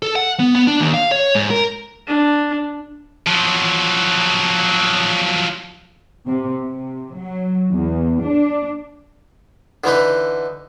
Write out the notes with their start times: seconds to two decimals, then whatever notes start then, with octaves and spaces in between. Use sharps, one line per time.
0.02 A4
0.16 F#5
0.40 B3
0.55 B3
0.67 D4
0.80 D#2
0.94 F5
1.12 C#5
1.35 G#2
1.50 A#4
2.07 D4
3.27 F3 F#3
6.28 C3
6.64 C3
7.16 F#3
7.73 E2
8.22 D4
9.84 D3 E3 D#4 B4